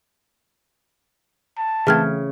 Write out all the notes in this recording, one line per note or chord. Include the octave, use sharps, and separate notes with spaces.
A5
C#3 E3 A3 C4 E5 F6 G#6